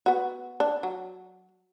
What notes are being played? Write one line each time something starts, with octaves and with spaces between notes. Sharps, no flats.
B3 F#4
D4
F#3